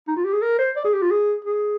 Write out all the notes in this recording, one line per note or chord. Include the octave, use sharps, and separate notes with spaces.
D#4
F4
G4
G#4
A#4
C5
D5
G#4
G4
F4
G#4
G#4